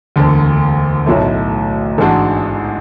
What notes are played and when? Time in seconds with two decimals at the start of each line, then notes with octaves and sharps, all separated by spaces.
0.16 E1 D2 D3
1.06 B1 A2 F#3 A3
1.98 A1 G#2 G#3 D4 F#4